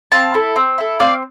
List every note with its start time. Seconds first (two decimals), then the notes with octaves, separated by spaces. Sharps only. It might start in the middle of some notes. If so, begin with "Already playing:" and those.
0.12 C4 F5 A5
0.34 E4 A4
0.56 C4
0.78 E4 A4
0.99 C4 D5 F5